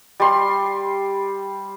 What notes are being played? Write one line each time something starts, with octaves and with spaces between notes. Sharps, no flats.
G3 C6